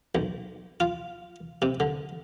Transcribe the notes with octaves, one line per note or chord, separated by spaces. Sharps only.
B1
F4
C3
D3